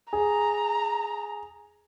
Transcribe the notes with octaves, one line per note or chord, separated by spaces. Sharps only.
G#4 A#5